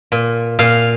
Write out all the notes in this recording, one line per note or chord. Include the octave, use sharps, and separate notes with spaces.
A#2
A#2 F5